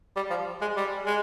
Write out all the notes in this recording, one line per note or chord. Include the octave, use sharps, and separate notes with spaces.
G3
F3
G#3
G3
G#3